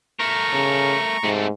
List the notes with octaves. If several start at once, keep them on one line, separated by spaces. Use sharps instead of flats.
A3 A#4 A#5 C#6
C#3
G#2 C3 A3